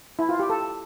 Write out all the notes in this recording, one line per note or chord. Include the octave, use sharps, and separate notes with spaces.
E4
F4
G4
A4